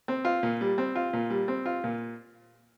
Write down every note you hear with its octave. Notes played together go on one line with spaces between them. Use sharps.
C4
F4
A#2
G3
C4
F4
A#2
G3
C4
F4
A#2